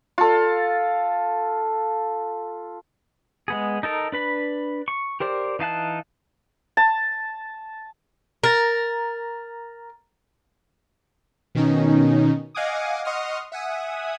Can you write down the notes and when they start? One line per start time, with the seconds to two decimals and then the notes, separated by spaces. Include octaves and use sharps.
0.18 F4 A4
3.48 G#3 B3 G#4
3.83 D#4 A4 A#4
4.12 D4 B4 B5
4.88 C#6
5.20 G4 A#4 C5 D5
5.59 E3 D#4 F5 A5 F#6
6.77 A5
8.44 A#4 A#5 A6
11.55 B2 D#3 C#4 D#4
12.55 D#5 F5 F#5 G#5 D6 D#6
13.05 D#5 F#5 C6 C#6 D#6 F6
13.52 E5 F#5 G#5 D#6